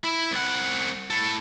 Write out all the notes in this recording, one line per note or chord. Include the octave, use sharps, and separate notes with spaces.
E4
C2 F#5
A2 A4